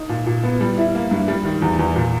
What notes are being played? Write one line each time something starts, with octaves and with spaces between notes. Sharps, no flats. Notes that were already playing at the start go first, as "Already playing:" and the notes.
Already playing: D#4
A#2
A#2
B3
G3
E4
A#3
G2
G3
D#3
E2
E2
A#2